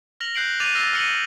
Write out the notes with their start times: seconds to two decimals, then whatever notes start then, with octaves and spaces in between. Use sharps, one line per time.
0.20 F6 A#6 F7 F#7
0.35 F#6 G6 C7 D7 F#7
0.60 D6 F#6 A6 D#7 F7 F#7
0.75 E6 F6 A6 A#6 C7
0.93 F6 A#6 C#7 D#7 F#7
1.08 F#7